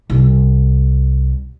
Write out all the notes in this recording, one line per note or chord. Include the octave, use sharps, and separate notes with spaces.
C2